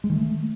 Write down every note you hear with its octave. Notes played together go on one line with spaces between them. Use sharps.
G#3
D#3
A3